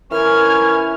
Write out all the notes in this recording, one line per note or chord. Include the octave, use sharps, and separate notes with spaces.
E3 C#4 A#4 F6 G#6